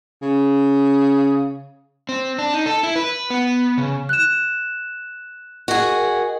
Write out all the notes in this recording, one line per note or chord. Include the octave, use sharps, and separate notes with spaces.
C#3
C4
D4
D#4
A4
E4
B4
B3
C#3
F#6 E7
F#4 G#4 A#4 D#5 G5